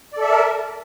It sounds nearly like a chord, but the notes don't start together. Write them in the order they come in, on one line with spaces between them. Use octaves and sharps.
D5 A4 E5 A5 A#4